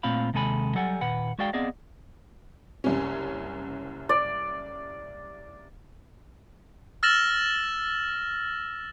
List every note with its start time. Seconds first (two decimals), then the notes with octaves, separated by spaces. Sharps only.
0.03 A#2 A3 C4 F4 F5 B5
0.34 D#2 C3 G#3 A4 G#5 B5
0.75 F#3 G3 A4 F#5 G#5
1.01 D#2 A#2 B4 F#5
1.39 G#3 F#4 G#4 D5 F5 G5
1.53 B3 C4 G#4 D5 D#5 F5
2.84 F#1 C2 C#4
4.09 D5
7.03 E6 F6 A6 A#6 E7 F#7